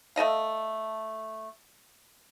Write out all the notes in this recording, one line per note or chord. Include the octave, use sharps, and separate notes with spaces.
A3 A4 D#5 F5